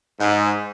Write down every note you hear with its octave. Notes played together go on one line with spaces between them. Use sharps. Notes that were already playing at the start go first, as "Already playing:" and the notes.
G#2